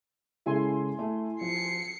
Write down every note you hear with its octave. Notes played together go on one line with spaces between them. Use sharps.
C#3 G#3 E4 A4 G#5 C6
A3
F3 C7 C#7